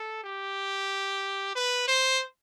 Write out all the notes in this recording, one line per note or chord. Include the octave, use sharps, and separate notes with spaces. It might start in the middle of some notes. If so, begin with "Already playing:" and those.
Already playing: A4
G4
B4
C5